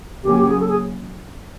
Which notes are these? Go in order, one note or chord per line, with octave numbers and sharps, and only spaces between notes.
C#3 F#3 A#3 C#4 G4
G4
G#4
A4
G#4